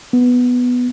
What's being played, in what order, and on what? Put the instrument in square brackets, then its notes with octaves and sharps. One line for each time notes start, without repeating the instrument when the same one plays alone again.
[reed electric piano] B3